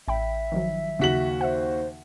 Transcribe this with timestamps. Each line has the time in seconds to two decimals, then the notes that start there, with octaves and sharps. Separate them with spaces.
0.08 A1 E5 G5 B5
0.52 D#3 F3 F#3
0.99 D#2 C#3 F#4 B6 F#7
1.41 C5 E5 F#5